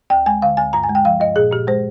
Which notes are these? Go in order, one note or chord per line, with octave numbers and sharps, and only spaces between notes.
D2 G5
G#3 G#5
D3 F5
D2 G#5
G2 A#5
G#5
G#3
G5
F3 F5
G2 D#5
A#2 G#4
A#2 G4
G#3 C5